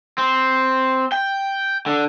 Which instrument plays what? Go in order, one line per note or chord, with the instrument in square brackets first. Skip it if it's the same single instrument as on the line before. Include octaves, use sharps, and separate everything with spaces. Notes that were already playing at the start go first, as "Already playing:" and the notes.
[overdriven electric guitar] C4
G5
D3